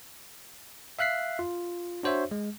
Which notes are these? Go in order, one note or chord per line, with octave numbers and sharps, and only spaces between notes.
E5 F5 F#6 B6 C7
F4
D4 F#4 C5 C#5 E5
G#3